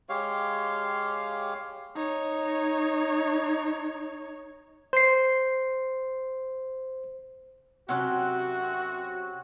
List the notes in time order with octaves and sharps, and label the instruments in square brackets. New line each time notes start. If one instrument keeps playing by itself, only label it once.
[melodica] G#3 G4 C#5 F5
[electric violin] D#4 C#5
[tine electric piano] C5 C7
[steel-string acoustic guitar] C3 F#3 G4 [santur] C4 C#4 F#5 [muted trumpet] F#4 [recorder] F#6